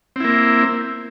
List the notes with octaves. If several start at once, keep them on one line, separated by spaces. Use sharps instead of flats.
A#3 C4 E4